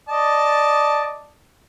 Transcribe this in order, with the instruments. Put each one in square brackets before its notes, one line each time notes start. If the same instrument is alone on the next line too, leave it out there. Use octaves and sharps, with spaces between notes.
[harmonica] D5 D#5 A5